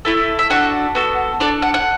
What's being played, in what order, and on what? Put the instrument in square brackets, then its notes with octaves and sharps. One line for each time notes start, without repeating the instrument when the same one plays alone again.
[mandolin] A3 E4 A4
E5
D4 F#4 A4 F#5
B3 F#4 A4
D4 A4 D5
F#5
F#5